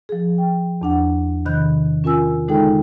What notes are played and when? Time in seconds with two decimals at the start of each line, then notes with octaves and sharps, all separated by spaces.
0.09 F3 G#4
0.38 G5
0.81 E2 D4 F#5
1.45 C3 D#3 B5 F#6 G6
2.04 C#4 F4 A#4 G#5 E6
2.48 D3 G#3 D#4 G#4 A4 G5